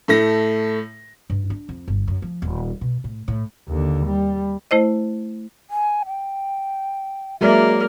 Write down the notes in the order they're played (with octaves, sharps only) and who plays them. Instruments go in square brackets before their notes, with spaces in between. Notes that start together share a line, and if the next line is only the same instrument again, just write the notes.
[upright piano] A2 A3 A#6
[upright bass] G2
D4
F2
G1
F#2
F3
D#1
B2
A2
A2
[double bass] D#2 D3
G3
[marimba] A3 E4 C5 D#5
[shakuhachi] G#5
G5
[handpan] F#3 G#3 D5 [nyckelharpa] A#3 A#4 [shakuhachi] E5